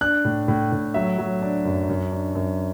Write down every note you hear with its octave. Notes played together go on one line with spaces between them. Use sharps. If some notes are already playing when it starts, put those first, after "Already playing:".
D4 F#6
A2
A2
A2
F#3 E5
F#3
D4
F#2
F#2
D4
F#2